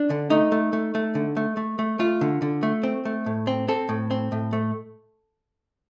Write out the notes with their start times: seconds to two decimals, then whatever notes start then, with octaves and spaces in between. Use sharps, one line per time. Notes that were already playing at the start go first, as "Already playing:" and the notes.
Already playing: D4
0.10 D3
0.30 A3 D#4
0.52 A3
0.73 A3
0.95 A3
1.15 D3
1.37 A3
1.57 A3
1.79 A3
1.99 A3 F4
2.21 D3
2.42 D3
2.63 A3
2.83 C4
3.05 A3
3.26 A2
3.47 C4
3.68 C4 A4
3.89 A2
4.11 C4
4.32 A2
4.53 A3